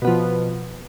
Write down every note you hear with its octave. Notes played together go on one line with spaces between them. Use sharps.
B2 F3 B3